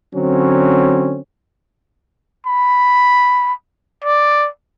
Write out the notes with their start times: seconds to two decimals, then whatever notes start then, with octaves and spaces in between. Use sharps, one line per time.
0.15 D3 F#3 C4 C#4
2.46 B5
4.04 D5